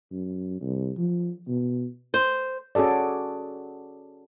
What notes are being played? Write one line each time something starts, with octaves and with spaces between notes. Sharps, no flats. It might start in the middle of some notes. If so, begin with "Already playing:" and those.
F#2
C2
F3
B2
C5
C#4 F#4 G#4 A4 D5